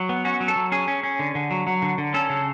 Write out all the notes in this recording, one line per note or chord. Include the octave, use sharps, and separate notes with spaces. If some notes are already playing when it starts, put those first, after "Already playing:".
Already playing: F#3
B3
C#4 F#4
F#3
A4
F#3
C#4 G#4
C#4
C#4
D3
D3
F#3
F#3
D3
D3
C#4 A4
C#3